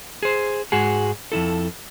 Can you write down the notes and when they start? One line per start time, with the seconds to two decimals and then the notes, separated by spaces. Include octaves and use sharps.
0.23 G#4 C5
0.72 G#2 G#3 F#4 G#4
1.32 F2 C3 E4 A4